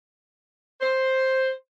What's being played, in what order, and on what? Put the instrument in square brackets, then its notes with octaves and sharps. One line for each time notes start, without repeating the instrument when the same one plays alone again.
[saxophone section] C5